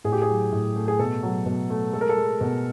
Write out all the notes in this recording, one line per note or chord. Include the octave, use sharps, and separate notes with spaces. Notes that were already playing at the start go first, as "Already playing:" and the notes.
A2 G#4
G4
G#4
F#3
A2
A3
G#4
B2 A4
F#3
B2
A3
G#3 A4
A#4
A4
G#3
B2